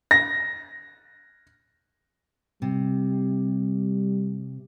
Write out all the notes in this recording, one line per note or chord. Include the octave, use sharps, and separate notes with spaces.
A#6
C3 G3